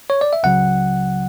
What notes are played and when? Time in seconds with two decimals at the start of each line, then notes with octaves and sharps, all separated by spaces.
0.10 C#5
0.21 D5
0.33 E5
0.43 C#2 C#3 F#3 F#5